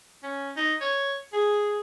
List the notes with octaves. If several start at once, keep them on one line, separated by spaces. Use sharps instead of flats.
C#4
D#4
C#5
G#4